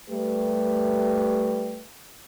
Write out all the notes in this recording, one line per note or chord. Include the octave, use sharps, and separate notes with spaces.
G3 A3 G4 B4